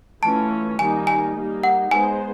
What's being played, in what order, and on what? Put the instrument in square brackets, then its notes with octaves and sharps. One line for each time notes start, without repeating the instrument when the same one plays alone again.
[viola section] E3 A3 C#4 F4 [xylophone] A5
[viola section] D#3 G3 A#3 D#4 [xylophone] G#5
[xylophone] G#5
[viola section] G3 A#3 D#4
[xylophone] F#5
[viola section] G#3 B3 D#4 G#4 C5 [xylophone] G#5